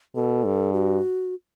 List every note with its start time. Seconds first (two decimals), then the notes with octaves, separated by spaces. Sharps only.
0.15 B2 A4
0.45 G2
0.73 F#4